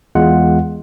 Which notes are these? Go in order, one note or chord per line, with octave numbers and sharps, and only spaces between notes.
E2 G#3 F4 F#5